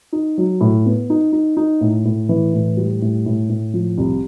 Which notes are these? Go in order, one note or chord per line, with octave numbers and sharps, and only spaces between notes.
D#4
F#3
A2
B3
D#4
D#4
D#4
A2
A2
E3
A2
G3
A2
A2
A2
F3
C2